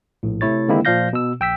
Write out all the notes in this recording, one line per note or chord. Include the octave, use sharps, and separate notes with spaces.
A#1 A2
C3 A3 E4 C#5 A6
D3 D#3 G#3 A#3 C4 E4
A#2 F3 D5 F5 G6 A#6
B2 E6
A#1 G5 E6 B6